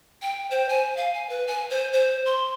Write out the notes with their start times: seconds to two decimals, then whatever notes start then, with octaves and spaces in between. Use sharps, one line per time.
0.22 G5
0.51 C5
0.69 G#5
0.97 F5
1.14 G#5
1.29 B4
1.47 G#5
1.70 C5
1.93 C5
2.26 C6